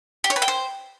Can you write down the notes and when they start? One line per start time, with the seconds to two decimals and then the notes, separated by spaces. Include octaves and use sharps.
0.24 G4
0.30 C#5
0.36 B4
0.42 G5
0.48 C5